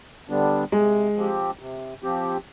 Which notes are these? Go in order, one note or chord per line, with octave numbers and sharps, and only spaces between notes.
D3 G3 B3 D4
C3 G#3
F3 C4 G4
C3
F3 C4 G4